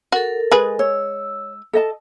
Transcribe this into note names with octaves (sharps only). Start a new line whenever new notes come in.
F#4 A4 A#4
G#3 G#4 B4
C#5 E6
A4 D#5 A5